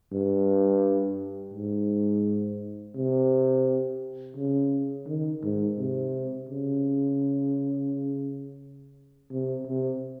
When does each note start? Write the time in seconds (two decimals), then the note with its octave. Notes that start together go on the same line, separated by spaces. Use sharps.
0.13 G2
1.54 G#2
2.95 C3
4.37 C#3
5.07 D#3
5.43 G#2
5.78 C3
6.49 C#3
9.31 C3
9.67 C3